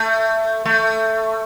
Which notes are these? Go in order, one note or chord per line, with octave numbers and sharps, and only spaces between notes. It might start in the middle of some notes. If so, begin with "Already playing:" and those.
Already playing: A3
A3